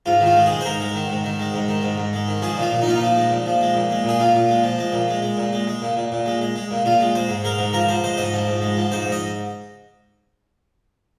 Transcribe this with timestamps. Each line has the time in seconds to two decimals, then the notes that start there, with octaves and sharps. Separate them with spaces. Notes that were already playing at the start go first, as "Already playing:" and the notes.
0.06 G#2 F4
0.21 D#3
0.26 F4
0.36 G#3
0.46 G#3 G#4
0.61 C5
0.65 G#2 A#4
0.80 G#3
0.95 D#3
1.10 G#2
1.24 D#3
1.40 G#3
1.54 G#2
1.68 D#3
1.83 G#2
1.98 G#2
2.13 G#3
2.28 D#3
2.42 F3 G#4
2.57 A#2 F4
2.71 A#2
2.82 D#4
2.86 A#2 F4
2.96 D#4
3.01 F3
3.16 G#3
3.31 A#2
3.46 F3
3.61 G#3
3.75 A#2
3.90 G#3
4.04 A#2 G#4
4.19 A#2 F4
4.35 A#2
4.49 G#3
4.64 F3
4.79 G#3
4.93 A#2
5.08 G#3
5.22 G#3
5.37 A#2
5.53 G#3
5.67 G#3
5.82 A#2
5.97 A#2
6.12 A#2
6.26 G#3
6.41 G#3
6.56 G#3
6.71 A#2
6.85 A#2 F4
7.00 G#3
7.15 G#3 C5
7.29 G#2
7.44 G#3 A#4
7.59 G#2
7.73 F3 A#4
7.89 F3 C5
8.04 G#3 C5
8.18 G#2 D#5
8.33 F3
8.48 G#2
8.62 G#3
8.77 F3
8.92 G#2 C5
9.07 G#2
9.12 D#5